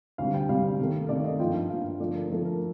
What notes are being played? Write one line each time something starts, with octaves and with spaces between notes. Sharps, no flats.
D2 C3 G3 F5
G5
D2 C3 G3 F5
C3 D#3 A3
C3 D#3 A3 D5
D#5
G2 F3 A#3 F4 G5
G2 F3 A#3 F4 F5
D3 F3 A3 D5
A#4
D3 F3 A3 A4
A#4